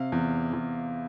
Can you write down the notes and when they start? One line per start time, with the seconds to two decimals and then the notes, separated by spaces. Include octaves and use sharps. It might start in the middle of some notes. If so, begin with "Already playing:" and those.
Already playing: C3 F5
0.12 E2
0.53 E2